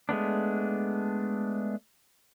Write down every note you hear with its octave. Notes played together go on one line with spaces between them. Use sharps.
G#3 A3 B3 D4